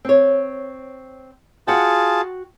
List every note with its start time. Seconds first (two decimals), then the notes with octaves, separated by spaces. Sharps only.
0.05 C4 C#5
1.67 F4 F#4 G#4 F#5 G5 A5